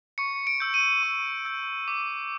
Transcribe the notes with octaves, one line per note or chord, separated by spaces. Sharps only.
C#6 C#7
D7
E6 G6
D#7
C#6
E6 G6
D6